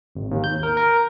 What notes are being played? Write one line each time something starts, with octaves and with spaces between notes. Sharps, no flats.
G#1
D#2
G6
A#4
A#4